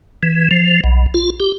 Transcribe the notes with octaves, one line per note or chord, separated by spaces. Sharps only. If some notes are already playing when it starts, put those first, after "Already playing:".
E3
F3
B1
F4
G4